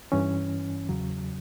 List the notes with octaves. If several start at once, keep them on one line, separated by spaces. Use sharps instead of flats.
G2 E3 C#4
E2 C#3 F#3